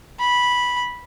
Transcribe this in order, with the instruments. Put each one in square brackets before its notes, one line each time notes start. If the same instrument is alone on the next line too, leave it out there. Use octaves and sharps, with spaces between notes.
[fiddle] B5